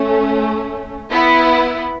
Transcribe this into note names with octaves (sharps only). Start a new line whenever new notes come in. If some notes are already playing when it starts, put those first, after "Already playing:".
Already playing: A3 C#4
B3 E4